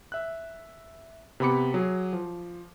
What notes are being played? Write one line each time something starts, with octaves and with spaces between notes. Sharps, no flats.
E5 F#6
C3 B3 B5 D6 C#7
F#3 G#4
F3